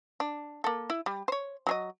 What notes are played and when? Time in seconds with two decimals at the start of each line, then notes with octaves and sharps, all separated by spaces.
0.20 D4
0.64 A#3 A4
0.90 E4
1.06 G3
1.28 C5 C#5
1.67 F#3 G#4 D#5